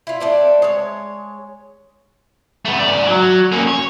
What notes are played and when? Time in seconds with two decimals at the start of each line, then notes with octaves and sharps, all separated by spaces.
0.07 E4 F4
0.20 A3 C4 D4
0.62 G#3 C#5
2.65 A3 B3
2.79 G#2 D5
3.07 F#3
3.52 A#3 C#4
3.68 C#5